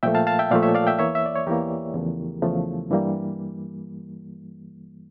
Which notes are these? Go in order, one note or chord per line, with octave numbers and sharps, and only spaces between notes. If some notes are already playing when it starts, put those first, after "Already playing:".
A#2 F3 A3 E5 G5
F5 A5
F5 A5
E5 G5
A#2 F3 A3 D5 F5
C#5 E5
D5 F5
E5 G5
E2 E3 A#3 C#5 E5
E5
D5
C#5
E2 E3 A#3 G4 A#4
E2 C#3 F3 A3
E2 C#3 F3 A3
G2 E3 G3 A#3